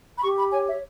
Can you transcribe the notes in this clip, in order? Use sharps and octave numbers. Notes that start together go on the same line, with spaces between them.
B5
G4 C#6
B5
C#5 G#5
E5